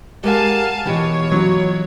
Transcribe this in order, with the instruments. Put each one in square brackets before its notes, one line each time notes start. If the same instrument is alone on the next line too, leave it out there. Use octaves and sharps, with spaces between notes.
[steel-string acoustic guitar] G#3 [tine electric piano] G4 A#4 F#5 [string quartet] F5 G#5 A5
[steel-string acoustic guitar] B2 F4 G4 [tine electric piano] E3 D#5 [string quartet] C#5
[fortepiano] F#3